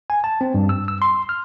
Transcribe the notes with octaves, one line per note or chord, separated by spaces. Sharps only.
G#5
A5
C4
G2
E6
E6
C6
F6